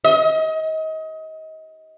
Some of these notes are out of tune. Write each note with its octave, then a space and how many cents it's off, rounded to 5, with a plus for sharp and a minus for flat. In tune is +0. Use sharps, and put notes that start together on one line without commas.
D#5 +30